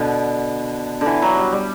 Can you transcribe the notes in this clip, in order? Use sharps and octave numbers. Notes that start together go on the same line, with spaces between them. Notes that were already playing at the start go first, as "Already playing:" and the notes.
Already playing: B2 D3
D3
E3
F#3
G3
G3